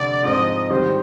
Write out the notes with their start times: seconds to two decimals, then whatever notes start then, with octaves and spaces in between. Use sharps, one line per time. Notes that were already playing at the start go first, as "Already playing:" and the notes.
Already playing: F1 D3 D5
0.23 G#2 F3 C4 D#5
0.70 G#2 D#3 G3 C4 G4 C5